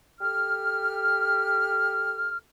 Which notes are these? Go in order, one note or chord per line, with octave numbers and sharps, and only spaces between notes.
G4 A4 F6